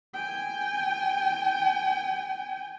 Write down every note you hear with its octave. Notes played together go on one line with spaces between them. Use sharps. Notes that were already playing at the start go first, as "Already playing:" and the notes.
G5 G#5